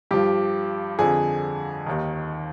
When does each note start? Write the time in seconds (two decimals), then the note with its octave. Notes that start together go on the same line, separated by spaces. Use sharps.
0.11 G2 F3 G4
0.99 F2 D3 F3 G#4
1.86 D#2 D#3